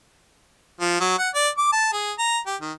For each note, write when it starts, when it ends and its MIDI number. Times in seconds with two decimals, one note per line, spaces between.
0.81 1.00 53
1.00 1.18 54
1.19 1.29 78
1.35 1.48 74
1.58 1.72 86
1.72 1.91 81
1.93 2.12 68
2.19 2.38 82
2.46 2.56 67
2.61 2.72 51